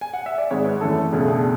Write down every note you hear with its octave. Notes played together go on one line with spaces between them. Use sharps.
G#5
F#5
E5
D5
G#1 G#2 G#3 C#5
B4
F#2 E3 A3 A4
C#2 B2 A3 D4 G#4
G#4